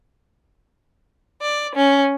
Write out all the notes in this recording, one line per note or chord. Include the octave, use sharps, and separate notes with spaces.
D5
C#4